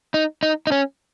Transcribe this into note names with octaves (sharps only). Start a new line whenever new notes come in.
D#4
D#4
D#4
C#4